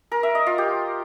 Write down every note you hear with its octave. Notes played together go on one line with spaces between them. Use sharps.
A#4
E5
D#5
F4
G4